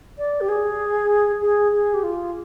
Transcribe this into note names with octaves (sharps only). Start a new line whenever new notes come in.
D5
G4
G#4
G#4
G#4
G4
F4